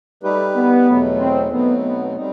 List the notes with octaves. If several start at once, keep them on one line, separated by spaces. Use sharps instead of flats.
G3 A3 D#4 G4 B4
B3
E2 B2 F#3 A3
C4
B2 F#3 A3 B3 C4 D#4
B3
G3 C4 D#4